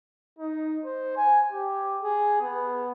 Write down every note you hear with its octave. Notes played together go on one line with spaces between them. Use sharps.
D#4
C5
G#5
G4
G#4
B3